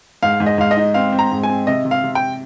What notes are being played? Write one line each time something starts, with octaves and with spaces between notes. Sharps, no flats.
G#2 F5
G#2
D#5
G#2 F5
D#5
D#4
C4 F5
C4
A#5
G#2
G#5
C4
C3 D#5
C3
F5
C3
G5